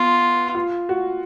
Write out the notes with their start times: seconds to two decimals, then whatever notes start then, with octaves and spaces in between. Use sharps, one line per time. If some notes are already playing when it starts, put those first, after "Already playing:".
Already playing: B3 F4
0.55 F4
0.89 F#4